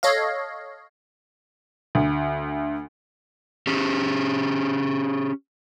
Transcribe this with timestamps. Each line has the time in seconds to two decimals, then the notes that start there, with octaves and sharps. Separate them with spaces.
0.03 A4 C#5 D#5 F5
1.95 D2
3.67 C#4 G4 G#4